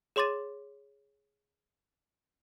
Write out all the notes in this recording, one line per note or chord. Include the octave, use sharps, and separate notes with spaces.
G#4 C#5 C6 D6 A6 D#7